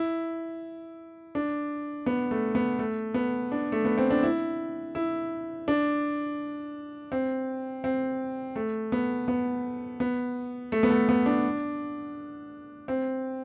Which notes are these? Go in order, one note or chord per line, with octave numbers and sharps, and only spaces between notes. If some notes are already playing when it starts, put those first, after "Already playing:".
Already playing: E4
D4
B3
A3
B3
A3
B3
D4
A3
B3
C4
D4
E4
E4
D4
C4
C4
A3
B3
B3
B3
A3
B3
A3
B3
D4
C4